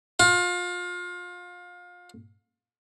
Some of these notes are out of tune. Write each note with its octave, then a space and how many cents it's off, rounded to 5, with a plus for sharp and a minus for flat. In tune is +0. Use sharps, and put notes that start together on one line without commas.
F4 +30